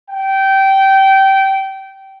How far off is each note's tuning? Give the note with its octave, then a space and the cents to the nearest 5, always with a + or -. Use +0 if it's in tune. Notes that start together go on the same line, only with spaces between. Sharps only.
G5 -20